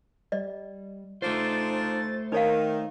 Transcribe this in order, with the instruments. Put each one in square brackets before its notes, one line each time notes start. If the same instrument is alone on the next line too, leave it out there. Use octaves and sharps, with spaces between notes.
[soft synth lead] G3 [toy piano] D5 D#5
[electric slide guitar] A3 C5 [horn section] D4 D#4 F4 [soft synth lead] A6
[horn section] D#3 [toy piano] D#4 C#5 F5 [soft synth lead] A#4